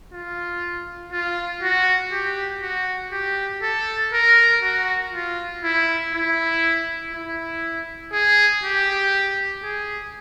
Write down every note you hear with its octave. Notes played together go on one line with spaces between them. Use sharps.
F4
F4
F#4
G4
F#4
G4
A4
A#4
F#4
F4
E4
E4
E4
G#4
G4
G#4